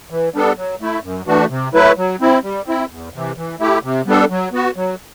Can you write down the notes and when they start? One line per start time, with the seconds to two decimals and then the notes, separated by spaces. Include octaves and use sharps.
0.10 E3
0.34 G3 B3 D4 A4
0.57 F#3
0.81 A3 E4
1.03 F#2
1.26 E3 A3 D4 F#4
1.50 C3
1.74 F#3 A3 E4 B4
1.97 F#3
2.21 C4 E4
2.43 G3
2.66 C4 E4
2.90 E2
3.14 C3 E3
3.37 E3
3.60 A3 E4 G4
3.83 C3
4.06 G3 B3 D4 A4
4.30 F#3
4.52 B3 F#4
4.76 F#3